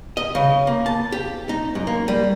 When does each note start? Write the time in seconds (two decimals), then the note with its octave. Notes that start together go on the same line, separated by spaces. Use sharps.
0.17 D#5
0.35 C#3
0.67 A#3
0.86 A5
1.12 G4
1.49 D#4
1.75 F#2
1.87 A#3
2.08 G3